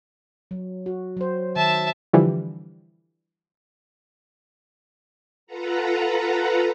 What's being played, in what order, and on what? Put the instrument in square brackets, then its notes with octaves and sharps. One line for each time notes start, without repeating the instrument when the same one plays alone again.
[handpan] F#3
F#4
F#3 C5
[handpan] D#3 [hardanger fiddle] E5 A5
[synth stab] D3 E3 F3 G3
[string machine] F4 A4 B4 F#5 A#5